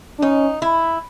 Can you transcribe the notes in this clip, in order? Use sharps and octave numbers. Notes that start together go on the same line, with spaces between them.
D4
C#4 D#4
E4